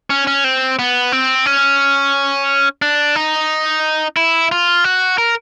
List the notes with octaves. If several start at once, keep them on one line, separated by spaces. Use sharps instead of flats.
C#4
C#4
C4
B3
C4
C#4
D4
D#4
E4
F4
F#4
A#4